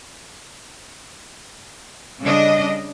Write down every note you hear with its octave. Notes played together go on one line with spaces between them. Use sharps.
C#3 G3 D4 D#5